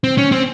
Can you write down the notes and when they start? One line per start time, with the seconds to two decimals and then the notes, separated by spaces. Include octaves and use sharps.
0.04 C4
0.18 C#4
0.32 C4